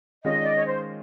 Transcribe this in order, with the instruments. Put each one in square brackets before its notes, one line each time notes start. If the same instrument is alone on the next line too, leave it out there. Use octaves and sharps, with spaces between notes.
[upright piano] D#3 G#3 C#4 F4 [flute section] D#5
[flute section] D5
C#5
C5